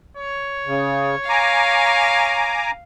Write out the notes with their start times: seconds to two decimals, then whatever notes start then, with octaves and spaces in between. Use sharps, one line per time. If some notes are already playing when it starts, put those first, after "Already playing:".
0.17 C#5
0.67 C#3
1.29 F5 G#5 A#5 D6